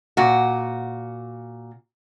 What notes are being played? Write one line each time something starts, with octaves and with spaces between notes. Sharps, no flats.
A#2 F#4